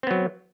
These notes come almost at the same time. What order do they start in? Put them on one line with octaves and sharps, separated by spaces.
C4 B3 F#3